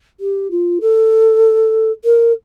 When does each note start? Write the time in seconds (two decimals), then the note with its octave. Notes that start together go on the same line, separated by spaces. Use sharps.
0.20 G4
0.51 F4
0.81 A4
2.05 A#4